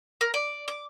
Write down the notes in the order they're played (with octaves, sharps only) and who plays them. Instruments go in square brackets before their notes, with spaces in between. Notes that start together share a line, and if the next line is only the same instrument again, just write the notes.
[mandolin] A#4
D5
D6